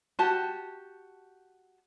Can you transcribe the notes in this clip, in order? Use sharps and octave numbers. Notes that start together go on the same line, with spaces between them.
F#4 G4 A5